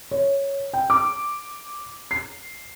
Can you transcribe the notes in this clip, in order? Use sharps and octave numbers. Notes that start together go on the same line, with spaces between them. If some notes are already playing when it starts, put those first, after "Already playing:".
C#5
G5
D6
C7